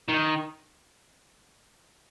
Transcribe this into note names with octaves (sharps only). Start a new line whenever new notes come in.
D#3